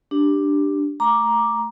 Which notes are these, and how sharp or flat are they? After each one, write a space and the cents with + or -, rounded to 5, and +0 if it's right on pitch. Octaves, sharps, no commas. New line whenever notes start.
D4 +0 G4 +0
A3 +0 A#5 +10 D6 +0